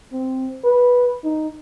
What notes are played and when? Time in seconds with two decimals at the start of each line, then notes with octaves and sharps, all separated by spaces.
0.12 C4
0.64 B4
1.24 D#4